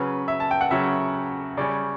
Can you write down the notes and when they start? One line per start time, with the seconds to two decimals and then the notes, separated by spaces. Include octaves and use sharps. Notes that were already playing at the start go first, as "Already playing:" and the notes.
Already playing: C#3 F#3 C#4 B4
0.28 E5
0.40 A5
0.51 G5
0.61 F#5
0.71 C#3 F#3 C#4 E5
1.57 C#3 G3 C#4 D5